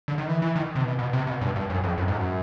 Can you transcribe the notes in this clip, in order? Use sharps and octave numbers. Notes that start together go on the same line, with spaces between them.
D3
D#3
E3
E3
D#3
C3
B2
B2
C3
B2
G2
G2
F#2
F2
F#2
G#2
F#2